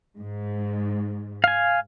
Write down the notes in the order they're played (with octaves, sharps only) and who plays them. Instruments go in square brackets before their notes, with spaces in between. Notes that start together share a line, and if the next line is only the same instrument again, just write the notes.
[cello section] G#2
[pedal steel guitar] F5 G#5